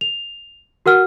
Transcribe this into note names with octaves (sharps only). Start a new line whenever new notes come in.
F7
F#4 A#4 F#5 F6